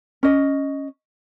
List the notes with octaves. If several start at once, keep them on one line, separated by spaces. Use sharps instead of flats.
C#4 D#5